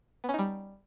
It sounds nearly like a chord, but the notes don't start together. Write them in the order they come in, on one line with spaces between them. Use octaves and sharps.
B3 C#4 D#4 G3